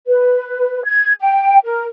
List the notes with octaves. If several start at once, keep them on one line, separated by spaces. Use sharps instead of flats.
B4
G#6
G5
A#4